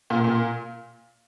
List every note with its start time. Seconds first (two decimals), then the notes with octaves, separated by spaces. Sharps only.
0.10 A#2
0.24 A#2